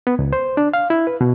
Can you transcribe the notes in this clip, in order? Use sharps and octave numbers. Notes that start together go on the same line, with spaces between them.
B3
C#2
C5
D4
F5
E4
B4
B2